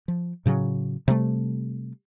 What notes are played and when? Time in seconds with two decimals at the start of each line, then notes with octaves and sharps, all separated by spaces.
0.08 F3
0.46 A2 C#3 F#3
1.08 C3 G3 A3